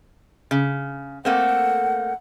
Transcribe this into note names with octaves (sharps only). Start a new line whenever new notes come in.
C#3
A3 A#3 C4 F#5